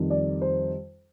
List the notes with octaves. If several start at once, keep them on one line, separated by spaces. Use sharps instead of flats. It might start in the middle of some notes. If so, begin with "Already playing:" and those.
Already playing: F2 D#3 G3
D5
C5